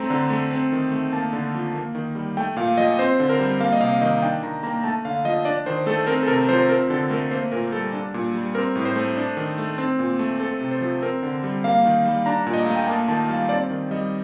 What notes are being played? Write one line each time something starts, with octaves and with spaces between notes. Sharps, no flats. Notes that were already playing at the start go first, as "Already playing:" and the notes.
Already playing: A3 C4 A#5
D3
A3
C4
D#3
A3
A#3 A5
D3
F3
A#3
D#3
G3
A3 G5
A#2 F5
F3 D#5
C4 C5
D3
A#4
G3
A#3 F5
D#5
C3 F5
D#3 D#5
D4 G5
D#3 A#5
A#3 A#5
A3 A5
D3 F5
F3 D#5
D4 D5
D#3 C5
A3 A4
C4 A#4
A4
C3 A#4
F3 C5
C4 A#4
D3 A4
A3 A#4
A#3 C5
A#2 A#4
G3 A4
D4
A#2
G3
C4 A#4
A2
C5
A3
D4
D#3
A3
C4
A#2
A3
C4 A4
C3
C5
F3
C4 A#4
D3
G3
A#3 F5
D#3
G3
D4 A#5
A#2
D#5
A3 F5
G5
A#3 A5
D#3 A5
G3 F5
C4 D5
D#3
G3 D#5